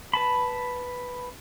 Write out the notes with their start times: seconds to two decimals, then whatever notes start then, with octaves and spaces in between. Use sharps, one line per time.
0.14 B4 A5 B5